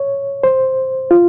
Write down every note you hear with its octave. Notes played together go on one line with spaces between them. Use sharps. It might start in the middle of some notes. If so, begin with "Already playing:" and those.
Already playing: C#5
C5
F4